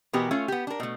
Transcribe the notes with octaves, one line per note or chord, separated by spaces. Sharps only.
B2 E3 B3 G4 A#4
A3 C#4 F4
B3 G4
D4 A#4
B2 A3